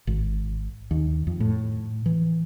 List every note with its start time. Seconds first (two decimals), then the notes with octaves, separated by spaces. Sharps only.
0.07 G#1
0.91 D#2
1.27 F2
1.40 A2
2.06 E3